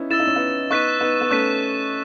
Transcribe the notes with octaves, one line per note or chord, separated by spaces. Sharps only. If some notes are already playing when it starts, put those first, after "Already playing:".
Already playing: B3 C#4 D#4 E4
E4 E6 A6 E7
D#4
C#4
B3 D#4
B3 D#4 C#6 F#6 B6 D#7
B3 D#4
B3
A3 C#4 C#6 F#6 B6 D#7